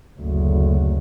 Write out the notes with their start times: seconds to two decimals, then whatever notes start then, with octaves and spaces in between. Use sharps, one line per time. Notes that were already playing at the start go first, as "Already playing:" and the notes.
0.20 F#1 D2